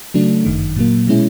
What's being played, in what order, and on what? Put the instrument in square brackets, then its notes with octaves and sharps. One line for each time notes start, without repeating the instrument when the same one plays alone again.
[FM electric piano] C#3 F#3 A3 D4
G1 F#2 D#3
A#2 F#3 A#3
B2 G#3 C#4 E4